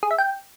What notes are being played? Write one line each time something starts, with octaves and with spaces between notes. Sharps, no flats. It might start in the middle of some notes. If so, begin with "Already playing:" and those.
G#4
E5
G5